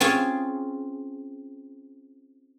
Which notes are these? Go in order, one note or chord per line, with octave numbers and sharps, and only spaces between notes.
C4 C#4 F4 G#4